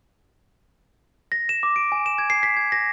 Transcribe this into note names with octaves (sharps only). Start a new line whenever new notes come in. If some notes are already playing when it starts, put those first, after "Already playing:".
A#6
E7
D6
D7
G#5
E7
G#6
C7
B6
G#6
A#6